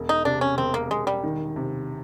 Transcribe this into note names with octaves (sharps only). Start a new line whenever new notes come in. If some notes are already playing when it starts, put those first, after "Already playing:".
Already playing: E1
D#4
C3 D4
C#4
E1 C4
A#3
E1 G#3
G3
D#3
C3